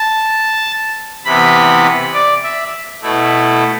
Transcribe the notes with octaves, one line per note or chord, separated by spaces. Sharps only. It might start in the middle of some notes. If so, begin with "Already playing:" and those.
Already playing: A5
C3 E3 B3 B5
D5
E5
B2 A3 E4